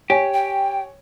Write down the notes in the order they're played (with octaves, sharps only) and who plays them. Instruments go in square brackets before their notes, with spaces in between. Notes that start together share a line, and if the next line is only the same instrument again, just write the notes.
[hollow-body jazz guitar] G4 [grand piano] C#5 G#5
[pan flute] G5